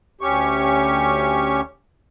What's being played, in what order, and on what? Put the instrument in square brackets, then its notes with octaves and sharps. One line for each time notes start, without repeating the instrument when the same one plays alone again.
[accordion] D2 C#4 G4 C#6